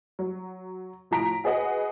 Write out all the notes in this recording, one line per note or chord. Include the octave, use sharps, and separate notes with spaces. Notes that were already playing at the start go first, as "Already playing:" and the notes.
F#3
A2 F3 A#5 B6 D7
F#4 G#4 B4 D#5 F#5